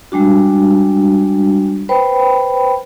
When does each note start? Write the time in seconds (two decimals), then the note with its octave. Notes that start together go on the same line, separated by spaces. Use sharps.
0.12 G3 G#3 D4 F#4
1.89 B4 C5 G5 B5